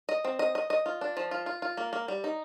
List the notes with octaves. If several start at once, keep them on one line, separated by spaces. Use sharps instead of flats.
D#5
C4
D#5
D#5
D#5
F4
D4
F3
F4
F4
F4
A#3
A#3
G3
D#4